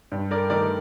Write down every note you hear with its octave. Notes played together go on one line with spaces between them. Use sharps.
G2
A#4 D5
D#3 A3 A#4 D5